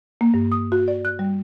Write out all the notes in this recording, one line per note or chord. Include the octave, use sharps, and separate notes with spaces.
A#3
G2
D#6
F#4
D5
F#6
G3